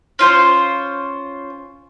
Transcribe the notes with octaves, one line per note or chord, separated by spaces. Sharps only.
C#4 F4 C5